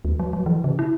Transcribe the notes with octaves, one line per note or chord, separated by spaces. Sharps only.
D#2
F#3
F#3
E3
C#3
E4